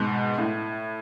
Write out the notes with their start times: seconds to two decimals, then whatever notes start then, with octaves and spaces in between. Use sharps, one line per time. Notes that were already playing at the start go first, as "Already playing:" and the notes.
Already playing: G#2 B2
0.38 A2